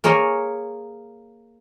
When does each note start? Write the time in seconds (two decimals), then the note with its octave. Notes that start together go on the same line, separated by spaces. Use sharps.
0.04 A#3 G#4 C#5 A#5